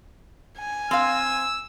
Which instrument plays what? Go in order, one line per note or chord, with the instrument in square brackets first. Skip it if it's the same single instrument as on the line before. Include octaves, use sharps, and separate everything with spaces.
[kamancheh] G#5
[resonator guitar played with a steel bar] C4 F5 [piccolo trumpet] E6